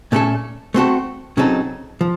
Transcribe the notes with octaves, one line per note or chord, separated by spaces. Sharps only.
A#2 A3 C#4 A4
A3 C4 F#4 A4
C#3 F#3 C4 D#4 A4
F3